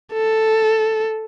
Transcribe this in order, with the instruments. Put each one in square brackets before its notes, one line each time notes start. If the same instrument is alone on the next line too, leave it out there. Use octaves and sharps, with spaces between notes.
[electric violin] A4